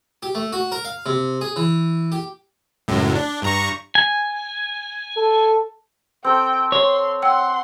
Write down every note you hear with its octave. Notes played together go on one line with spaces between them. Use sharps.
G4
A3
F#4
A#4
F5
C3
G#4
E3
G4
C#2 F#2 A2
D4
G2 A#5 C#6
G#5
A4
C4 A4 G5
C#5 C6
F#5 G5 C6 E6